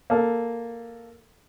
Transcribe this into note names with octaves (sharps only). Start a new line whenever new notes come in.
A#3 A4